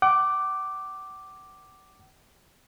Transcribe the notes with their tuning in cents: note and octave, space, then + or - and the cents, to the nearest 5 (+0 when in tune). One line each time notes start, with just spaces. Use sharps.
F#5 +40 D6 +0